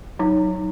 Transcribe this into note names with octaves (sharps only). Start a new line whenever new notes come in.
F#3 D#4